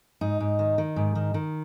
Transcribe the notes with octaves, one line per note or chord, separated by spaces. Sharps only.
G#2 D#4
G#2
D#3
D#3
G#2
D#3
D#3